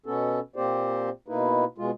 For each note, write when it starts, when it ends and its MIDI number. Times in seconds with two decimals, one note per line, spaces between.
0.06 0.40 47
0.06 0.40 59
0.06 0.40 61
0.06 0.40 69
0.56 1.10 46
0.56 1.10 58
0.56 1.10 60
0.56 1.10 67
0.56 1.10 72
0.56 1.10 74
1.28 1.64 47
1.28 1.64 58
1.28 1.64 63
1.28 1.64 64
1.28 1.64 71
1.78 1.91 47
1.78 1.91 56
1.78 1.91 65